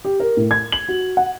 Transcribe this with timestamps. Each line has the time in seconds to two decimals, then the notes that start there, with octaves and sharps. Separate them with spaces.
0.05 G4
0.20 A#4
0.37 A2
0.51 G#6
0.72 F#7
0.89 F#4
1.17 F#5